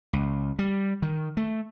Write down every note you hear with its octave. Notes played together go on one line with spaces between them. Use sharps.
C#2
G3
D#3
A3